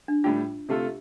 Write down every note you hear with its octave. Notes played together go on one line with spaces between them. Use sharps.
D4
A2 G3 D4 F4 G4
C3 A3 F4 G4 A4